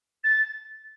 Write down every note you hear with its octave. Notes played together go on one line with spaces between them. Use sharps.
A6